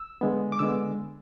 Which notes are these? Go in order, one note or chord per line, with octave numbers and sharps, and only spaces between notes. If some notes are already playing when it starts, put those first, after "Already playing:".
Already playing: E6
D3 G#3 B3
D6
D3 G#3 B3 E6